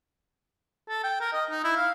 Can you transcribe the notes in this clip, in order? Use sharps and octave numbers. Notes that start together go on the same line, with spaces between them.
A4
G5
A#4
D#5
D#4
E4
F5